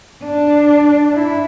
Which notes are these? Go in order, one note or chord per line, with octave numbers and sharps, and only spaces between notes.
D4
E4